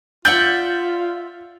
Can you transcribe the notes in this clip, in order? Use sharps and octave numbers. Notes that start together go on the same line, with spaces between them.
F4 D5 E5 F#5 G6